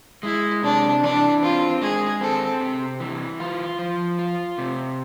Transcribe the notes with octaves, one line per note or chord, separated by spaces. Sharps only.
G#3 E4
C3 D4
E3 D4
C4 F4
G#3 G#4
C4 A4
C3
E3
F4
F3
F4
C3